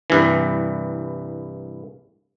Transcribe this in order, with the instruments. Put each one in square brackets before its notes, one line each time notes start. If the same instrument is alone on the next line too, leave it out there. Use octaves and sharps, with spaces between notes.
[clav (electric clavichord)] C2 G2 E3